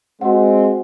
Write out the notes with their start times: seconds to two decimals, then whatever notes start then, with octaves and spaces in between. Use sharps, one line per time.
0.21 G#3 C4 F#4 G#4 F#5